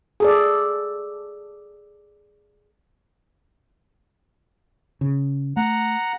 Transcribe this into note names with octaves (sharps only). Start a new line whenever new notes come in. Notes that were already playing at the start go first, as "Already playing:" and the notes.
G#4 A4 D5
C#3
A3 F#5 A#5